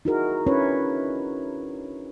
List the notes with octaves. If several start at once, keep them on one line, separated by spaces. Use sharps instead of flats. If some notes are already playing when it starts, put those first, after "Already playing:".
D#4 E4 F#4 G#4 A#4
C#4 D4 E4 B4 C#5